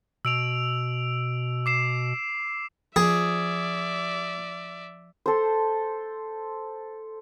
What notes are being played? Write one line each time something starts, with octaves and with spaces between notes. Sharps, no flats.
B2 E6 D7 F7
D6 C7 E7
F3 G#4 D5 E5
A4 C5